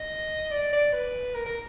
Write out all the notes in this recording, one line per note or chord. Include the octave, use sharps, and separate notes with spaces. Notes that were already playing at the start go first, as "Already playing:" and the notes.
Already playing: D#5
D5
D5
B4
A#4
A#4